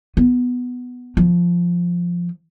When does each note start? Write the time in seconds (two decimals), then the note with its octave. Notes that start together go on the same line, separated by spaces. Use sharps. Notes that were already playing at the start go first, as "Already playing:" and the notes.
0.17 B3
1.17 F3